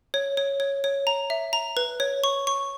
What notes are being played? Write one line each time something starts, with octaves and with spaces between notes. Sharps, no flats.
C#5
C#5
C#5
C#5
A#5
E5
A#5
B4
C#5
C#6
C#6